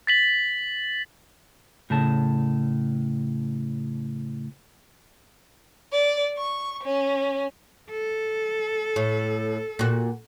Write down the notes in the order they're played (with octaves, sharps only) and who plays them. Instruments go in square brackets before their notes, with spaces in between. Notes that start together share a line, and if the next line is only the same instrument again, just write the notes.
[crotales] A6 B6 F#7
[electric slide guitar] A2 C#3 A5
[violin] D5
C#6
C#4
[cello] A4
[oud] A2
A#2 F#4